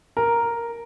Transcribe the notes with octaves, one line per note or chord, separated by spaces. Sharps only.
A#4